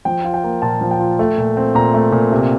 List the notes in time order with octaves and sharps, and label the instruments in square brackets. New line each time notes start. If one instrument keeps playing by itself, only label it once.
[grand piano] F3 G5
F4
G5
A#3
A#2 A5
F3
G5
F4
A3
A#2
C4
A#2 A#5
A3
A#2
C3